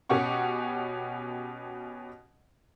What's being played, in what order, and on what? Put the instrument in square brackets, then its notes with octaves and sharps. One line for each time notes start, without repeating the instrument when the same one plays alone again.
[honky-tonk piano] B2 C#4 G4 F#5 C#6